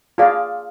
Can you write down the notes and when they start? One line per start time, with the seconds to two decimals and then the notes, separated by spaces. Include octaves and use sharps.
0.18 F4 G#4 D5 F5